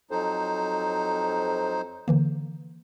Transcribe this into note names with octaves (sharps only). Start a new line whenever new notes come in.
F2 F#3 D#4 C5
D3 E3 A#3